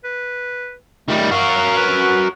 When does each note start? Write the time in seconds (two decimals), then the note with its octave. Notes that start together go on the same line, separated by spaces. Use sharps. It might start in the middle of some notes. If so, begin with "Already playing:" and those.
0.04 B4
1.08 D#3 G3 A3
1.31 F#4 A#4 F5
1.77 B4